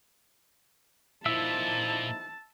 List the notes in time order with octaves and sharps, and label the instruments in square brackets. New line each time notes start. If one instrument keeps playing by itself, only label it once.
[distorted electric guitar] A#2 [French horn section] F3 D#4 E4 [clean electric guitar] E5 [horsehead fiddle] A5